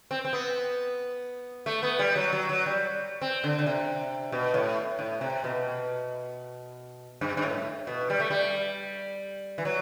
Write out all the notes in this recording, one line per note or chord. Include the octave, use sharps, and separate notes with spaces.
C4
C4
B3
A3
B3
G3
F#3
F#3
F#3
G3
C4
D3
D3
C3
B2
A2
A2
C3
B2
G2
G2
A2
B2
G3
A3
G3
E3
F#3